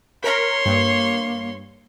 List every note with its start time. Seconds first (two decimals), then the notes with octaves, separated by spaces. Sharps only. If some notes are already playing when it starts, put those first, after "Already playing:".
0.23 A#4 C#5 C6 B6
0.66 G2 A#3